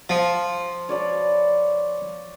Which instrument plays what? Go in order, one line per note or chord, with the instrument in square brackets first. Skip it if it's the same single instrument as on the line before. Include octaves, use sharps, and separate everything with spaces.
[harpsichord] F3
[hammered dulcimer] C#5 D5 B5